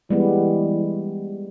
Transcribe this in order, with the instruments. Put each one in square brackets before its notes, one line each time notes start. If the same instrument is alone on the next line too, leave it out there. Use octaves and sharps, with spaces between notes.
[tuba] E3 [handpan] G3 G#3 B3